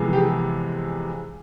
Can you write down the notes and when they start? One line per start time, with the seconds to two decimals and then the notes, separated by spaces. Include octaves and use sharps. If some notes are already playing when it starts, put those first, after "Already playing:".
Already playing: F2 C3 E3 G#3 B3
0.13 G4
0.17 G#4